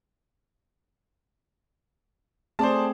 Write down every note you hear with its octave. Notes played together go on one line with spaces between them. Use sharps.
A3 C4 G#4 C5 D5 A5